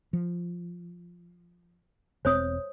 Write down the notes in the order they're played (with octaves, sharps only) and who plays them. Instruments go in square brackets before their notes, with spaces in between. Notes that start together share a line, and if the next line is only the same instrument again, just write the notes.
[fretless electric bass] F3
[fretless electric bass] E1 C4 [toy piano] C5 C#5 D#6